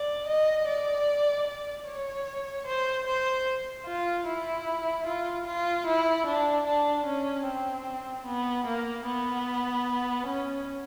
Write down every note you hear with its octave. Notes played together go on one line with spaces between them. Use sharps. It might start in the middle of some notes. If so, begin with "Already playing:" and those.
Already playing: D5
D#5
D5
D5
C#5
C5
C5
F4
E4
F4
F4
E4
D4
D4
C#4
C4
B3
A#3
B3
C#4